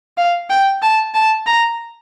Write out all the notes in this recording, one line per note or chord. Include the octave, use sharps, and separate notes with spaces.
F5
G5
A5
A5
A#5